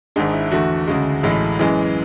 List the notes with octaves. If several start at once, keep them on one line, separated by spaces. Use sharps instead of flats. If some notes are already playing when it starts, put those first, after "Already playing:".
G#1 G#2 G#3 D4
E4
E2 D3 A3 F#4
D2 C#3 G#3
A1 A2 G#3
F#2 E3 G#3